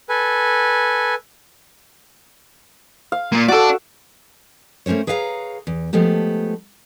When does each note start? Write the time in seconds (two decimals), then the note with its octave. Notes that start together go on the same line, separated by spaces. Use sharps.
0.09 A4 B4 G#5
3.12 F5
3.32 A#2 A#3
3.48 F#4 A4 D5 A5
4.86 A3 A#3 C#4 C5 C#5
5.07 G#4 B4 C#5 F5 F#5 A#5
5.67 E2
5.93 F3 G#3 A3 B3 G4